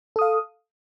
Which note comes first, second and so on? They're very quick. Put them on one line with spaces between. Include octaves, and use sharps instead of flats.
A4 D#6 F5